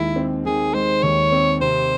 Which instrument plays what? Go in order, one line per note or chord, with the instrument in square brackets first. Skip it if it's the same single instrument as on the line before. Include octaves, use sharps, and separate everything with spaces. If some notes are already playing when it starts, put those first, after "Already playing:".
Already playing: [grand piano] D#2 D#3 G#3 [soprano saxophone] E4
[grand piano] C4
[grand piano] D#3 [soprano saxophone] G#4
[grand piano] G#3 [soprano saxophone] C5
[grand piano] D#2 [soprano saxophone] C#5
[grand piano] C4
[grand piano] C3 [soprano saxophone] C5